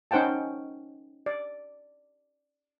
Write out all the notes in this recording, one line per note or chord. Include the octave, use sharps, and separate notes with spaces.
C#4 D#4 C5 F#5 G5 A5
D5